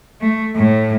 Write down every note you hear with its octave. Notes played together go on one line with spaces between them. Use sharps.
A3
A2